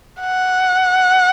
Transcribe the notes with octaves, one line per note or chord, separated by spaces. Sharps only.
F#5